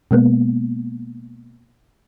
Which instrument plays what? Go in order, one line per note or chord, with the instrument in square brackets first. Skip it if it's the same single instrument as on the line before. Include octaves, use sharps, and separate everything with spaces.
[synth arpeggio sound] B2 G#3 A#3 B3